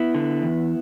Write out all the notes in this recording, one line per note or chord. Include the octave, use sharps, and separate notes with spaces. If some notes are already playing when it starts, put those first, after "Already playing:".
Already playing: B3 E4
D3
E2